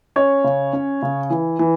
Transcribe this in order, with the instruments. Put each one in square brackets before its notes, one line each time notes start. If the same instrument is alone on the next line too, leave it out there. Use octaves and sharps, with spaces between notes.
[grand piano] C#4 C#5
C#3
C#4
C#3
E3
E3